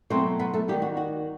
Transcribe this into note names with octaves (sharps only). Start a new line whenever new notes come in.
B2 F#3 A3 C4 E4 C5
B3 B4
A3 A4
D#2 D#3 G3 D#4 G4
F#4
F#4